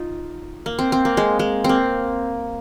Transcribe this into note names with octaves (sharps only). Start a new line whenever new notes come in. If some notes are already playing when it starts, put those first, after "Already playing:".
Already playing: D#4 F4
A#3
C4
C4
A#3
G#3
G#3
A#3 C4